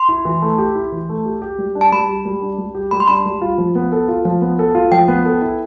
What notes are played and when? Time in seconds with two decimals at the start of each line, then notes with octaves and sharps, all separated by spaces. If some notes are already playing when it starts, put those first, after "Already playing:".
Already playing: C6
0.09 E4
0.25 E3
0.42 A3
0.58 G4
0.75 E4
0.92 E3
1.09 A3
1.25 G4
1.42 G4
1.58 G3
1.75 D4
1.81 A5
1.92 G3 B5
2.08 G4
2.25 G3
2.42 D4
2.58 G3
2.75 G4
2.91 G3 B5
3.00 C6
3.08 D4 B5
3.26 G3
3.42 F4
3.58 F3
3.75 B3
3.92 A4
4.08 F4
4.25 F3
4.42 B3
4.59 A4
4.75 F4
4.92 F3 G5
5.08 B3
5.25 A4
5.42 E4